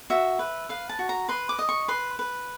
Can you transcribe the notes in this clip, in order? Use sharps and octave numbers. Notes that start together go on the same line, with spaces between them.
F#4 E5
B4
B4 F5
A5
F#4
A#5
B4 C6
D6
D#5
C#6
B4 C6
B4